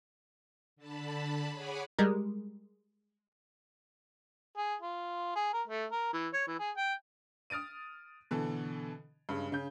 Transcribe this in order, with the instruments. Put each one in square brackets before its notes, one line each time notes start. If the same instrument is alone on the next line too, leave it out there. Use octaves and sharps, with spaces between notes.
[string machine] D3 A5 B5
G#4 C#5 F#5 G#5 B5 D6
[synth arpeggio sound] G3 G#3 A#4
[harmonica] G#4
F4
G#4
A#4
A3
A#4
E3
C#5
E3
G#4
G5
[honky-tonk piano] D#6 F6 A6 D7 D#7
B2 D3 E3 A4
G2 C#3 G#3
C#3 G6